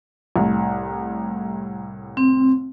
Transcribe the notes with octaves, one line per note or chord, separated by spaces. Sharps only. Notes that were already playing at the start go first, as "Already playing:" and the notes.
C2 A2
C4